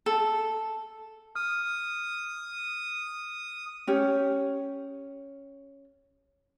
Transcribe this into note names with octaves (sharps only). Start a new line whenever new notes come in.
A4
D#6 F6
C#4 G4 C#5